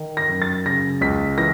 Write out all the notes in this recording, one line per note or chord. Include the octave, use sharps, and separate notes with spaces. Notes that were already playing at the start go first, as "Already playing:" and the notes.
Already playing: D#3
A#6
F#2
A6
C#3 A#6
C#2 B6
E3 A#6